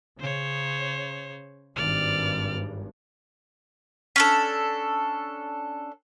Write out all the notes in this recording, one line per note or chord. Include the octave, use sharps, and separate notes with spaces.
C#3 C5 C#5
G#1 G2 D5 F6
C#4 D4 A4